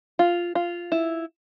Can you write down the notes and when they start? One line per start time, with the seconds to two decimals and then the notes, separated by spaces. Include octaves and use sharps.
0.19 F4
0.55 F4
0.92 E4